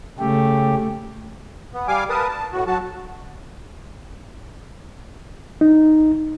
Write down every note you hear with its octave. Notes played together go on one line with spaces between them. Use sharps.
C#3 A3 G4
B3
G3 F5 G#5 D6
A#4 B4 A5 D#6
A5
A2 F#4
F#3 F#4 A5
D#4